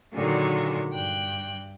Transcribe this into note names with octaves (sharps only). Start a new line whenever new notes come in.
A#2 D3 D#3 F#3 G#3
G2 G5 F#6